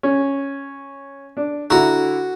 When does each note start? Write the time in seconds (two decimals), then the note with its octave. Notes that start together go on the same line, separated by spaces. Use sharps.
0.03 C#4
1.37 D4
1.70 D3 E4 F#4 A#5